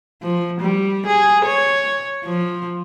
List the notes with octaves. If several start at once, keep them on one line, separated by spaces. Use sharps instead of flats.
F3
G3
G#4
C#5
F3